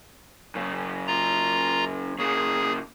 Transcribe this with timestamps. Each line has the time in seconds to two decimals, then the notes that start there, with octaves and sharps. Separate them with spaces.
0.55 F#2 C#3
1.07 F4 A#5
2.19 C#3 A#3 G#4